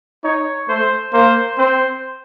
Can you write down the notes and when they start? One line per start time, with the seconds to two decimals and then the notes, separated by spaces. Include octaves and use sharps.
0.23 D#4 C#5
0.68 A3 C5
1.13 A#3 C5
1.58 C4 C5